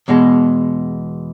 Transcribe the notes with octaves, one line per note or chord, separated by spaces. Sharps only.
E2 B2 G#3